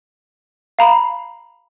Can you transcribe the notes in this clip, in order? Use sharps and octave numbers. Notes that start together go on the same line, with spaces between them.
F5 A#5 B5